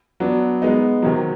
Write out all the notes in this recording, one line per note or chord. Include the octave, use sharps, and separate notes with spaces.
F#3 B3 D4
G#3 B3 D#4
C3 D#3 F#3